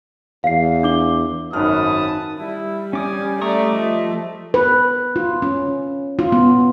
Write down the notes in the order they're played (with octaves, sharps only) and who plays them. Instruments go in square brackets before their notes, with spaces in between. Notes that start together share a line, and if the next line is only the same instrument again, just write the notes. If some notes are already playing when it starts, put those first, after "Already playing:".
[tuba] E2 [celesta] F5 C7
[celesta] D4 D6 G7
[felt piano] G#1 F6 [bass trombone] F#2 [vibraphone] D#4 [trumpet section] B4 A5 D#6
[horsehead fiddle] G3 [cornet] E4
[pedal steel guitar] C#4 D6 D#6 [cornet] G#5
[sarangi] A3 [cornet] D5 [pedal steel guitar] A#5 C#6 D#6
[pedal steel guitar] F3 [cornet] D#5
[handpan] B4
F4
C#4
F4
B3